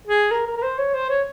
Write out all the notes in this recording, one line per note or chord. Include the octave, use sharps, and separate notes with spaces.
G#4
A#4
A#4
A#4
C5
C#5
C5
C#5